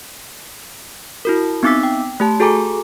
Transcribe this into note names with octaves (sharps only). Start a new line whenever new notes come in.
E4 F#4 A#4
B3 C4 D#4 D6 E6 B6
G5
A3 G4 A5
F#4 G#4 A4 G#5 A#5 D6